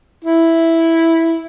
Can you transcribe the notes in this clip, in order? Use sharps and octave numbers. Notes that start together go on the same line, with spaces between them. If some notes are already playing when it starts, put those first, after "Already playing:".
E4